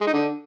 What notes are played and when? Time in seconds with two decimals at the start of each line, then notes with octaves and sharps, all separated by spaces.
0.01 G#3
0.07 D#4
0.13 D3